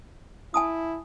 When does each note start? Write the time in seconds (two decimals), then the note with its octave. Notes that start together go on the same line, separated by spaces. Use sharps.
0.54 E4 G#5 A5 D#6